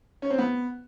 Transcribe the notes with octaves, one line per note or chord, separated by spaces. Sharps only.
C#4
C4
B3